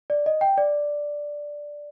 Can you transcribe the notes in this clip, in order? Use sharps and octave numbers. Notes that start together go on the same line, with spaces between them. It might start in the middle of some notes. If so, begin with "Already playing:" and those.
D5
D#5
G5
D5